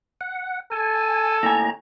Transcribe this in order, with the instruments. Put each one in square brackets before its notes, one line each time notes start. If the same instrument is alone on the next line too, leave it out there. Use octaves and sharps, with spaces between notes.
[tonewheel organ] F#5
[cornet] A4 [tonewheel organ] G#5
[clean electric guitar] D#2 A2 G#5 [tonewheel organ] A#5